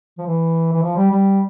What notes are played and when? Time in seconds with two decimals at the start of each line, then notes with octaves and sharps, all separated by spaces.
0.18 F3
0.26 E3
0.72 E3
0.83 F3
0.97 G3
1.11 G3